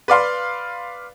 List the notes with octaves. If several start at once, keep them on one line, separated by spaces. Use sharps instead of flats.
B4 D5 F5 C6